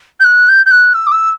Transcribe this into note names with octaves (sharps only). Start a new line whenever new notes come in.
G6
F#6
G6
G6
F#6
E6
D6
E6